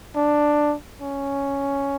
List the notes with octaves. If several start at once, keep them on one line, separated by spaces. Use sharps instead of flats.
D4
C#4